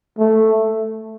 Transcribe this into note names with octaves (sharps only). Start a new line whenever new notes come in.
A3